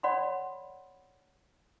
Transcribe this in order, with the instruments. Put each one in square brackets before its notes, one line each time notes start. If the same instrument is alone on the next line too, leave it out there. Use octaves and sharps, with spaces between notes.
[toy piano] C#5 D5 F#5 B5 C6